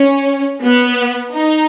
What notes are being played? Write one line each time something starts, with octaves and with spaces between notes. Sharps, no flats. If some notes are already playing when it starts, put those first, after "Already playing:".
Already playing: C#4
B3
D#4